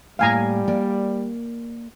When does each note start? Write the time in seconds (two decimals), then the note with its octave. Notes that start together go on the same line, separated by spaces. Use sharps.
0.19 A2 G3 A#3 F5 G5 G#5 A#5
0.68 A#3 A#4 D5